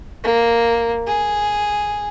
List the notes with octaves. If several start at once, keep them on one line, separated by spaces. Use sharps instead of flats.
A#3
G#4